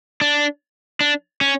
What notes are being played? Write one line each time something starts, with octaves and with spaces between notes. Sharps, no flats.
D4
D4
C#4